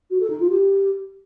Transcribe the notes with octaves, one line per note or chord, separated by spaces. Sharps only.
F#4
A4
D#4
F4
G4